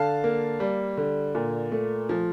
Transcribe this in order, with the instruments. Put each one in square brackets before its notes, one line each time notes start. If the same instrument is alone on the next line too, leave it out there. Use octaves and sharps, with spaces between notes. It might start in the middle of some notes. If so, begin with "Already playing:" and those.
Already playing: [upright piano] D3 F5 A5
A#3
G3
D3
A#2
A3
F3